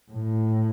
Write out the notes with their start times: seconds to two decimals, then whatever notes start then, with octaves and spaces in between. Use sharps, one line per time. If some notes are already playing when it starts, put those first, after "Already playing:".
0.11 A2